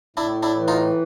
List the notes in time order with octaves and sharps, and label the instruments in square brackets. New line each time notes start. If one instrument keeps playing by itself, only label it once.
[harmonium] A2 [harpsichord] D4 E4
[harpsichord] D4 E4
[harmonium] E3
[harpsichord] D#4 F4